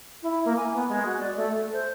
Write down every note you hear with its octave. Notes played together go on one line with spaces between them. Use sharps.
E4
A#3
G#5
B3
G#3
F#4
D5
A3
A4
C5